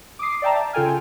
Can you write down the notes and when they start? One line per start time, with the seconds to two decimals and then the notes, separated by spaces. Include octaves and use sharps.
0.19 D6 D#6 C7
0.42 D5 E5 G5 A5 A#5
0.73 C#3 F4 A4 G5 G#5 F6